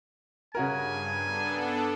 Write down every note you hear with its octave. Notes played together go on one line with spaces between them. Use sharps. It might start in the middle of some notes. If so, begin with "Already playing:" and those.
G2 C#3 F#4 A#4 G#5
B3 D4 A4